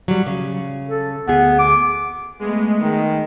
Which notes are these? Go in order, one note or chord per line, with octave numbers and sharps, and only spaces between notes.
F#3 G3
C#3
A4
D2 B3 G#4
D6
G#3 A3 B3
D#3